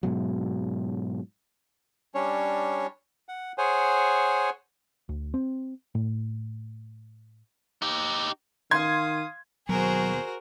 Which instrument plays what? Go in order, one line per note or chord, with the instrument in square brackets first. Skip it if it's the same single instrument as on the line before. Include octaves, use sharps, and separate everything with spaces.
[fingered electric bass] G#2 B2 F#3
[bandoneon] G3 C#4 D4 C#5
F#5
G#4 C5 C#5 F#5 G#5
[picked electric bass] D2
C4
A2
[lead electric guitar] D#4 G4
[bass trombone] D#3 [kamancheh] F5 D#6 [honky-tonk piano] C6 G#6
[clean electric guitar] D#2 B2 [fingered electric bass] F#3 [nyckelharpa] F#4 A#4 [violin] G#4 C5